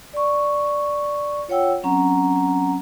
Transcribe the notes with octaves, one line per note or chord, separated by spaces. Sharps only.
D5 C#6
F4 C#5 F#5 G5 E6
F#3 C4 C#4 F#5 A#5